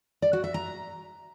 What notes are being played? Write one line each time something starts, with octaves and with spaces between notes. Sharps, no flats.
D5
F#4
E5
A#5